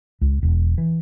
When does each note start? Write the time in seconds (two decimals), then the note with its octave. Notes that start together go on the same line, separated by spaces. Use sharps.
0.21 C#2
0.43 E1
0.78 E3